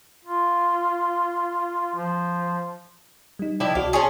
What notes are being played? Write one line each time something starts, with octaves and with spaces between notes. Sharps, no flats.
F4
F3
G3 D#4
F3 D4 E4 D#5 G5
C2 F#4 D5 F5
C#4 F4 G#4 A5 C#6